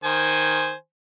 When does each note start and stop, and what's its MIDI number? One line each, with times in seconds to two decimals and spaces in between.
0.04 0.73 51
0.04 0.73 72
0.04 0.73 80